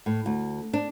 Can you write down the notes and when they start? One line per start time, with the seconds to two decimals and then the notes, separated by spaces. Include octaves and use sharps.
0.06 A2
0.26 D2
0.73 D4